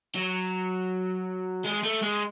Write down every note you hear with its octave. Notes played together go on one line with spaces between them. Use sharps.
F#3
G#3
A3
G#3